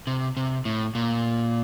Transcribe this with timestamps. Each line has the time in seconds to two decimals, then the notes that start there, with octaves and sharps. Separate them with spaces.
0.07 C3
0.37 C3
0.65 A2
0.95 A#2